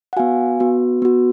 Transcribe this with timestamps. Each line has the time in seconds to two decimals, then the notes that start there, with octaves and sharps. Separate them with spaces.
0.13 F#5
0.17 B3 F#4 F5 G#5
0.60 B3 F#4
1.02 B3 F#4